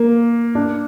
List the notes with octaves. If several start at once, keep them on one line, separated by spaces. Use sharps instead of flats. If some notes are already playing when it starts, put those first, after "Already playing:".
Already playing: A#3
D4